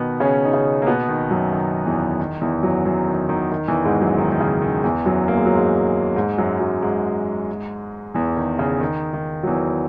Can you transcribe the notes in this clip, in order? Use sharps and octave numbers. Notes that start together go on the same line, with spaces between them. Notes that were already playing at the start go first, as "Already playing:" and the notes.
Already playing: B2 D#3 B3
C#3 C#4
D#4
C#3 C#4
A#3
B2 B3
D#3
F#2 F#3
D#3
E2 E3
D#3
E2 E3
F#2 F#3
F#2 F#3
D#3
D#3
D#3
E2 E3
G#2 G#3
F#2 F#3
D#3
D#3
C#3
D#3
E2 E3
F#2 F#3
A#3
G#3
F#3
G#2 G#3
G#2 G#3
F#2 F#3
F#2 F#3
G#2 G#3
E2 E3
D#3
C#3
D#3
D#3
F#3
E2 E3